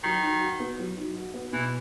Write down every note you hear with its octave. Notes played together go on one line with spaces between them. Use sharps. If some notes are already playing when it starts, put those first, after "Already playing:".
D#3 F#3
D#4
F#4
B3
F#3
D#4
F#4
B3
B2 E3